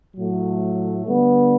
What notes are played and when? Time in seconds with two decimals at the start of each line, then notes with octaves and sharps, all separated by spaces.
0.15 A2 F#3 A3
1.05 D3 G3 B3